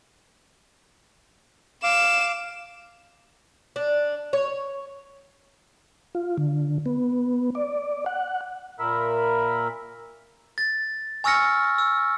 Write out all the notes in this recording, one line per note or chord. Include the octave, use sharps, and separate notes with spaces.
F5 D6 E7
D4
C#5
F4
D3
B3
D5
F#5
A#2 A#4 E5 B5
A6
G#5 C#6 E6 F6 A#6 C#7
E6